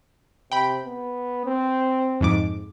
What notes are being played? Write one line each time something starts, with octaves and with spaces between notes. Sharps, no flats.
C3 G5 B5
B3
C4
F2 G#2 D6